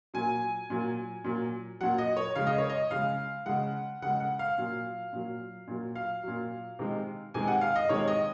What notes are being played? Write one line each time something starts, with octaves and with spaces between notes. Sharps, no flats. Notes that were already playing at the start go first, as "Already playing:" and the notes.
A#2 F#3 G#5
A#2 F#3
A#2 F#3
A#2 F#3 F#5
D#5
C#5
C#3 G#3 F5
D#5
C#5
D#5
C#3 G#3 F5
C#3 G#3 F#5
C#3 G#3 F#5
F#5
F5
A#2 F#3
A#2 F#3
A#2 F#3
F5
A#2 F#3
C3 D#3 G#3
C3 D#3 G#3 G#5
F#5
F5
D#5
C3 D#3 G#3 C#5
D#5